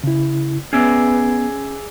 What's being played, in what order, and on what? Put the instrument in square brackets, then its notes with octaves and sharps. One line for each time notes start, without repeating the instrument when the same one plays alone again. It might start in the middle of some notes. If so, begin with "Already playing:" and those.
[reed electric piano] C#3 E4
[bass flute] B3 [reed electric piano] C#4 [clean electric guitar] G#4 D5 E5